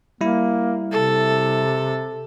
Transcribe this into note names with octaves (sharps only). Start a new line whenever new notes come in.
G3 A#3 E4
C3 A4